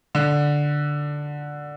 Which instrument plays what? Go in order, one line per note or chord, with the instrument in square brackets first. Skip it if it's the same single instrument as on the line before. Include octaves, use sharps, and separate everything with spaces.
[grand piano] D3